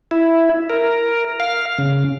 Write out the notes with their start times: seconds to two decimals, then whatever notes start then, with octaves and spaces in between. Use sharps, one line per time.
0.11 E4
0.70 A#4
1.40 F5
1.78 C#3